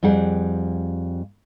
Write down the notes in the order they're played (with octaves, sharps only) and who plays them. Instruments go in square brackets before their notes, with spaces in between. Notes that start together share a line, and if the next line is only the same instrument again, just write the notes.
[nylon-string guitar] F2 G3 G#4 F#5